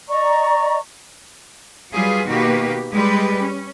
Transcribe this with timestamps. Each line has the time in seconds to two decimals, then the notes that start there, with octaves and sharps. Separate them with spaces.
0.08 D5 D#5 A#5 C#6
1.91 F#3 G3 F4 G#4 B4
2.25 B2 D#3 A#3 F#4 G4 B4
2.92 G3 G#3 G4 B4
3.41 C#4